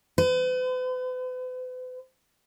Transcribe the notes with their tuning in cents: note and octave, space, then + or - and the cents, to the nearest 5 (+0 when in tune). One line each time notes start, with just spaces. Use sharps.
B4 +45